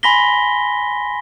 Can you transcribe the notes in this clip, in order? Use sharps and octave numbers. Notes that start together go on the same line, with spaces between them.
G#5 B5 C6 A#6 B6 G7